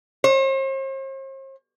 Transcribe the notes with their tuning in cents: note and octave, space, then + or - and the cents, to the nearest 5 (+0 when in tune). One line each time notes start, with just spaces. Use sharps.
C5 +45